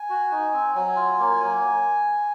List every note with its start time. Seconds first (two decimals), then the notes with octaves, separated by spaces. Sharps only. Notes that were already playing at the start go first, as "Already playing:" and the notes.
Already playing: G#5
0.10 F#4
0.32 D#4
0.53 C4
0.75 F#3 G#5
0.96 F4
1.19 A#3
1.41 F#3